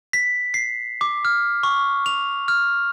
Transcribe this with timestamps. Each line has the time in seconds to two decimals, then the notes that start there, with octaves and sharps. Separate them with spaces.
0.13 B6
0.54 C7
1.01 D6
1.25 F6
1.63 C#6
2.06 F7
2.48 F6